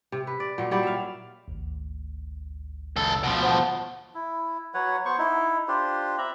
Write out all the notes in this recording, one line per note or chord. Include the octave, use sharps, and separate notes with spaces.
C3
B4
D5
A#2 F#3
F#3 G3 E4 D5
E5 F5
G#1 D2
C#2 A4
B2 F3
C5 F#5 A5
E4
F#3 B4 C#5 F#5
B3 C5 C#6
D#4 E4
D4 F4 G4 C5
C4 E5 A#5 B5